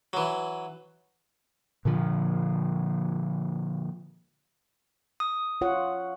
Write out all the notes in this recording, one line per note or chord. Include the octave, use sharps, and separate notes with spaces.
E3 F#3
A#2 D3 F3
D#6
F4 C#5 F#5